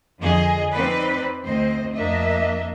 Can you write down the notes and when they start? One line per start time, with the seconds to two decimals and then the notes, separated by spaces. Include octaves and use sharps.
0.18 F2 D3 G#4 D#5
0.70 C4 D#4 B4 D5
1.43 D2 C4 C5 D#5
1.94 F2 A#3 D4 D#5 E5